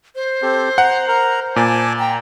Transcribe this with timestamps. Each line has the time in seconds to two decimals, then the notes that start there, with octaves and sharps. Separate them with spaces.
0.16 C5
0.42 C4 G4 A4
0.78 F#5 A#5
1.08 A#4 A#5
1.56 A#2 G#5 A5 D6
1.99 G5 A#5